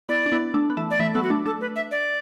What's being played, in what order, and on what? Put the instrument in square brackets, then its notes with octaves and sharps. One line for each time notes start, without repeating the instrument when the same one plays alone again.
[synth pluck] B3 E4 [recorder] D5
[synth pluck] D4
B3 E4
A3 D4
B3
E3 A3
[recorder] D5
[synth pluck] E3 A3 [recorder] E5
[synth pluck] F#3 B3 [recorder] A4
[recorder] F#4
[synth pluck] A3 D4
[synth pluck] A3 D4 [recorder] A4
[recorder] B4
E5
D5